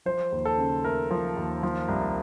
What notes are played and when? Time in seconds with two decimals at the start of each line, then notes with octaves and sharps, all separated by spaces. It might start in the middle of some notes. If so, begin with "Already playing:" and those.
0.06 F3 C5
0.32 D#2
0.45 A4
0.58 C#3
0.84 A3 A#4
1.11 F3
1.37 D#2
1.63 F3
1.89 C2